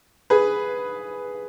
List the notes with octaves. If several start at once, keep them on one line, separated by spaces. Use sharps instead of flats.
G#4 B4